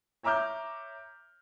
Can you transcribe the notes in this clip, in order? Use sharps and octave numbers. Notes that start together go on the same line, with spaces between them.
C#5 E5 A#5 D6 F6 G6